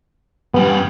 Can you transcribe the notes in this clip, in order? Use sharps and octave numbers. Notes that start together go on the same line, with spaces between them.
F#2 G3 B3